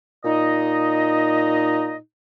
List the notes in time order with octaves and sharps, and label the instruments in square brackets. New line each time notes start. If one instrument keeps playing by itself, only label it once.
[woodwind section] A#2 D#4 D#5